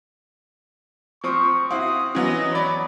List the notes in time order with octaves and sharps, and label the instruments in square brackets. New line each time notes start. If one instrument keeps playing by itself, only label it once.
[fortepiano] F3 C4 D#6 [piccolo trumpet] C#6
[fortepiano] C4 E4 F#4 [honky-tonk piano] F5 [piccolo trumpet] D#6
[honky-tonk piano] E3 F#3 B3 [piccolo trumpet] D#5
[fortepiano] C#5 D5 [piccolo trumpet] B5